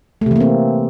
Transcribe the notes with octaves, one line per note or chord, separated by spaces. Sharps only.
C3 E3 A3 A#3 C4